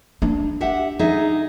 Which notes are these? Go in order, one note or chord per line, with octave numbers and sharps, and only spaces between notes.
D4
G4 E5 F#5
D#4 G#4 E5